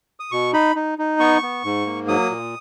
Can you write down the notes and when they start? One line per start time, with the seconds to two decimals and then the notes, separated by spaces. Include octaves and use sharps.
0.20 D#6
0.31 B2 C#6
0.53 D#4 B5
0.76 D#4
0.98 D#4
1.19 B3 C#6
1.43 B3
1.64 G#2
1.86 A#3
2.08 F#3 D#6
2.30 A#2